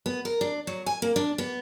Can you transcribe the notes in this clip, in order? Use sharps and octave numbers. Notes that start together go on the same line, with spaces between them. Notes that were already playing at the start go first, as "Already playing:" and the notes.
B3
A#4
D4
F#3
G#5
A#3
D4
B3